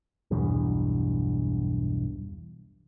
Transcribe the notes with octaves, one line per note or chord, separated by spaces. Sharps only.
B1 E2 G2